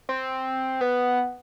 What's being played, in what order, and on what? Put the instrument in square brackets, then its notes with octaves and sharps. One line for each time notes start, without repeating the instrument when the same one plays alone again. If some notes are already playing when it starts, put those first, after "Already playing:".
[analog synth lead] C4
B3